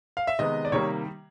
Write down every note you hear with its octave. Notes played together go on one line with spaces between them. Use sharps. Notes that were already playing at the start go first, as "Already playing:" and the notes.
F5
E5
C3 D#3 G#3 B3 D#5
D5
C3 D#3 G3 A#3 C#5